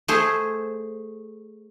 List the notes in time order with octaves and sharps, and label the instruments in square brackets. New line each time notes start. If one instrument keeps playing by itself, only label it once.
[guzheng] A3 G#4 C5